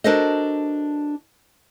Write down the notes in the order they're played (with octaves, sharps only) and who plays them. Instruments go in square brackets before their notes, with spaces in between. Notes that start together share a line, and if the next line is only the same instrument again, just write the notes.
[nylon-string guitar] D4 F#4 A4 A#4 C5 D#5